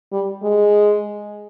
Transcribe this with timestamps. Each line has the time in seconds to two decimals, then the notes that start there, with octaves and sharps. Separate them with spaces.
0.12 G3
0.43 G#3